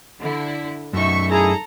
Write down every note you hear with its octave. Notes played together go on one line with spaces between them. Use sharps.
D3 E4
F#2 D#4 E5 C#6
E4 G#4 A4 A5 A#5